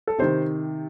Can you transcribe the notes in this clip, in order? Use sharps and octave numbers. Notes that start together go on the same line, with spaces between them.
A4
C3 D#3 C5